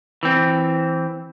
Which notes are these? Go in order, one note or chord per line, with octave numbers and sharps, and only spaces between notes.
E3 C4